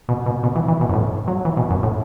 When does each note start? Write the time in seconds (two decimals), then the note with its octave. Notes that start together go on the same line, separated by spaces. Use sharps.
0.09 B2
0.26 B2
0.43 B2
0.56 E3
0.68 E3
0.81 B2
0.89 F#2
0.93 A2
1.27 F#3
1.45 E3
1.57 B2
1.70 F#2
1.83 A2